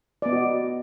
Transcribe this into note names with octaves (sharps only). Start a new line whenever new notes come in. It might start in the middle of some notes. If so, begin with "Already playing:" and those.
B3 F#4 D5 D#5